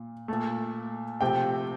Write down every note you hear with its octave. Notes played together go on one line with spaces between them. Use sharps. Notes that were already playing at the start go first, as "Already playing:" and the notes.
Already playing: A#2
A#2 A3
C3 F3 A3 G5